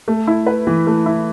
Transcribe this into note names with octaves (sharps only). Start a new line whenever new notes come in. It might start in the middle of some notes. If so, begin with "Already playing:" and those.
A3
E4
B4
E3
A3
E4